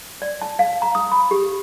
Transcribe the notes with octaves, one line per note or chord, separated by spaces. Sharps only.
D5
A5
F5
A#5
D#6
B5
G4